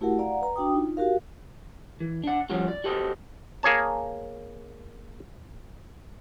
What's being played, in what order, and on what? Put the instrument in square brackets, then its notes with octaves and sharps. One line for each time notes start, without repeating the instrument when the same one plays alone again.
[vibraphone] A3 E4 F#4 G4 A#4 F#5
D5 F5 F#5 A#5
B4 A#5
D4 F#4 G5 D#6
D#4 F4
F#4 G4 A#4 F5
[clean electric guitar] E3
D4 F#5
F3 G3 C#4 F4 F#4
D5
F#4 G4 A4 C5 D#5
[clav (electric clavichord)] A#3 G#4 C#5 A5